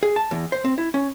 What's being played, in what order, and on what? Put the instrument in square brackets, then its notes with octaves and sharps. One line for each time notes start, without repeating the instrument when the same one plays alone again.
[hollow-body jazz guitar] G#4
A5
E2
C5
C4
E4
C#4